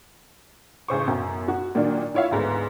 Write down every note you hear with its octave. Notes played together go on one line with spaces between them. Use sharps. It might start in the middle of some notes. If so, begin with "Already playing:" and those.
A1 C#3 C5 C#6
B1 F#2
F#4
A#2 D#3 F#3 A#3 D4
E4 F4 C#5 E5 F5
D2 G#2 B3